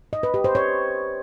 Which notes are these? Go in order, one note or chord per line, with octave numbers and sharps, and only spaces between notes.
D#5
B4
G4
C5
C#5